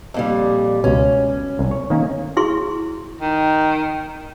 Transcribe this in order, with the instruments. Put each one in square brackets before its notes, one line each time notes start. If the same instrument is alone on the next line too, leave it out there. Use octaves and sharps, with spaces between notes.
[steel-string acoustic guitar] F2 A#2 G3
[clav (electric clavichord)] C#2 B2 [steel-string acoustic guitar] C#4
[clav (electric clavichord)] C2
C#5
D#3 A#3 C#4
[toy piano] E4 G#4 C6 C#6
[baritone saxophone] D#3